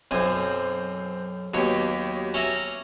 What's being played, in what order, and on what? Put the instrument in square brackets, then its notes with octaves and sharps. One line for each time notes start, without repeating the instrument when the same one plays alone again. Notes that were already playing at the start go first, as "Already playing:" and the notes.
[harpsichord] B1 F#2 G#5 [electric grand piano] C4 C5
[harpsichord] D#2 C#5 [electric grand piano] F#3 B3 G4
[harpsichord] C#4 E5 A#5